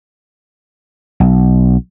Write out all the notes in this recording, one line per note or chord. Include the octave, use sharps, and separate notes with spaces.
B1